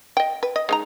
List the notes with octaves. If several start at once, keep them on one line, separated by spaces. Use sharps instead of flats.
D#5 G5
B4
D#5
G#3 D#4 A#5